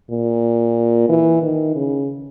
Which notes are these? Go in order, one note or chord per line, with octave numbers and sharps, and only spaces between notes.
A#2
E3
D#3
C#3